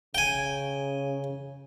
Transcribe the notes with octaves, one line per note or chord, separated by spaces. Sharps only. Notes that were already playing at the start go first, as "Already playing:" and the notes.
C#3 G5 G#5